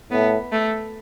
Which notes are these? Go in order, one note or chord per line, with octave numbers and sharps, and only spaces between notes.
A2 B3
A3